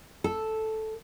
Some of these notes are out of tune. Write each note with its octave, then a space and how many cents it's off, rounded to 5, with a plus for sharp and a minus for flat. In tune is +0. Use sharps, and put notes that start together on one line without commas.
A4 -5